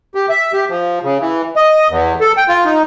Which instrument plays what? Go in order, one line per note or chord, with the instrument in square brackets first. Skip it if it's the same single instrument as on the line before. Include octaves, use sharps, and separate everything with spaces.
[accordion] G4
E5
G4
F3
C#3
E3
D#5
E2
A4
G5
F4
D#4